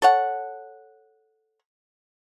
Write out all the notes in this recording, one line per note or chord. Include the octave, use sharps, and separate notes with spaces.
A4 C#5 F#5